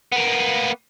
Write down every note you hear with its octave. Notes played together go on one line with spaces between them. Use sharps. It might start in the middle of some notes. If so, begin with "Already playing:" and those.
A#3 B3